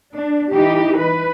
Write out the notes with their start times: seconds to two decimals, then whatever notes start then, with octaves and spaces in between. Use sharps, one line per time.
0.15 D4
0.54 E3 D#4 G4
1.00 B4